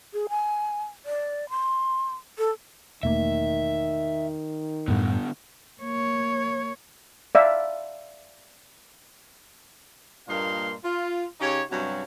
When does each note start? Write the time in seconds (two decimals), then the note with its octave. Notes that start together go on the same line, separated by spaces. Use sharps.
0.14 G#4
0.29 G#5
1.06 D5
1.50 C6
2.39 A4
3.03 E1 D#3 A3 A#3 E5
4.88 F#2 A2 D3 G3 B3
5.81 A#3 C#5
7.35 D5 E5 F5
10.29 G2 A#2 A#3 D#5 F5 C6
10.83 F4
11.40 C#3 D#4 G4 C#5
11.71 G2 C3 F#3 C#4 F#4